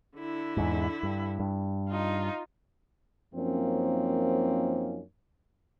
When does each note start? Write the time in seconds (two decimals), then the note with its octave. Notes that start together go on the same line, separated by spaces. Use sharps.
0.17 D3 E4
0.57 E2 G#2
1.03 G2
1.40 G2
1.89 D#4 F4
3.34 F#2 F3 A#3 C4 C#4 D#4